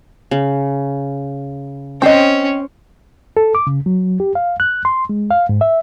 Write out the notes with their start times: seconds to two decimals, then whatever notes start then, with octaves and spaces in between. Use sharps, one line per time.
0.31 C#3
2.02 C4 C#4 C5 D#5 G5
3.37 A4
3.55 D6
3.67 C#3
3.86 F#3
4.20 G4
4.35 F5
4.60 F#6
4.85 C6
5.09 G#3
5.31 F5
5.49 G#2
5.61 E5